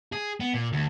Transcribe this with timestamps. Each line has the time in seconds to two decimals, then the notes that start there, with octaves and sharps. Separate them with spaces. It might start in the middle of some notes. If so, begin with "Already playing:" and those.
0.12 G#4
0.40 B3
0.54 A#2
0.73 D2